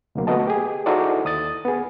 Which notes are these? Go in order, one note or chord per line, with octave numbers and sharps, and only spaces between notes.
D2 C3 F#3 A#3
A3 B3 F#4 D#5 A5
G4 G#4
D#4 E4 F#4 A4 C5 D5
D#2 D#6 A6
B3 G#4